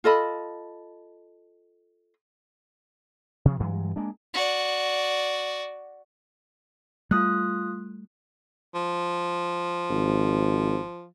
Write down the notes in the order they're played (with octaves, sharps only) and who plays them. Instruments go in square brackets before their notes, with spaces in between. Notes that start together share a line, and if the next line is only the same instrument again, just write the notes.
[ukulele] F4 A4 D#5 B5
[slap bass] C3 F3
G2 E3 F#3 G#3
G#3 A#3 D4
[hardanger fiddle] F#4 D5
[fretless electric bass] G3 A3 [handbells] F4 D#6 F#6
[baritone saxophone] F3
[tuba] G#1